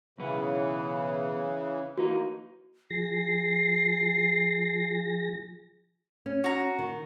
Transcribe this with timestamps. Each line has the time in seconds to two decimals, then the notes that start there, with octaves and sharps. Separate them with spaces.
0.18 B1 C#3 E3 B3
1.98 E3 A#3 D#4 F#4
2.90 F3 G#4 A#6 C7
6.26 C#4
6.44 F#4 A#5
6.79 D#3